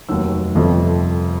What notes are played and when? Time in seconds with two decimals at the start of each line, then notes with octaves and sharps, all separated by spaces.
0.09 F1 D#2 D#3 F#3 E6
0.55 G1 F2 C3 F3 A3